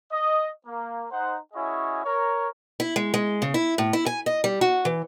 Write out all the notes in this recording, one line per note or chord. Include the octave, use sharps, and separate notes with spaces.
D#5
A#3
D#4 C5 F#5
C#4 E4 F#4 G#4 C#5 D#5
A#4 C#5
E4
G#3
G#3
C#3
E4
A2
E4
G#5
D#5
G3
F#4
E3